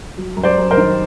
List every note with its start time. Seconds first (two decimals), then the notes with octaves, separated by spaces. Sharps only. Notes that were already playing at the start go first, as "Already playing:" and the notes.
0.18 F#3
0.37 F#2
0.43 C5 D5
0.58 F#2
0.71 A#4 C5
0.77 D#3